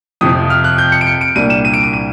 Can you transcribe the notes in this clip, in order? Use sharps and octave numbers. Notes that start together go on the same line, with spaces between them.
F2 C3 F3 D#6
F6
F#6
G6
C#7
D7
C#7
D7
C2 A#2 G3 A#3 D4 D#7
E7
D#7
D7
D#7
D#7